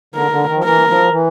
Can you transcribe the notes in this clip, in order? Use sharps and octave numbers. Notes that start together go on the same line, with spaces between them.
D3 A#4
D3
D#3
F3
E3 A#4
F3
E3